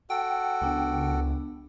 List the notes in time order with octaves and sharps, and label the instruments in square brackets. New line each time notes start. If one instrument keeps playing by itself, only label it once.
[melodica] F#4 A4 [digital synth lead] G5
[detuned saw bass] C#2 [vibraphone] B3 D4